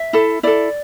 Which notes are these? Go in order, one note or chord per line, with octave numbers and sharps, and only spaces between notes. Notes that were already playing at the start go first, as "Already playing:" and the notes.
Already playing: E5
E4 A4
E4 A4 D5